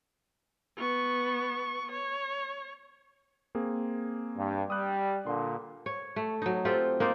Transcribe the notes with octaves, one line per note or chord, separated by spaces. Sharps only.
B3 C#6
C#5
A#3 C4 G#4
G2
G3 D#6 F#6
A#2 D3 C6
C#5
A3
F#3 D#4
C4 F4 G4 A4
A#3 D#4 C5 D5